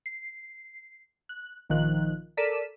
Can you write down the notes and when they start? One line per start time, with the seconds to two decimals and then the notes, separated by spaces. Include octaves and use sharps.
0.06 C7
1.29 F#6
1.70 A#1 D#3 F3 F#6
2.37 A4 A#4 D5 B6 D#7 E7